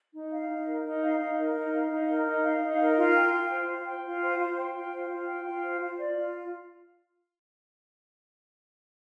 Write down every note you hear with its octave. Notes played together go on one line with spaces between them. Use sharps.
D#4
F5
D#4
A#4
D#4
F5
D#4
A#4
D#4
F5
D#4
A#4
D#4
F5
D#4
A#4
F4
G5
F4
C5
F4
G5
F4
C5
F4
G5
F4
C5
F4
G5
F4
C5
F4
D5
F4